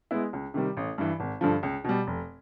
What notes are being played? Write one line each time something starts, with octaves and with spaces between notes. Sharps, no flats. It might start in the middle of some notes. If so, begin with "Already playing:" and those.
G#3 B3 E4
C#2
C3 D#3 G3
A1
G2 E3
G#1
G2 D3 F3
C#2
B2 G3
F1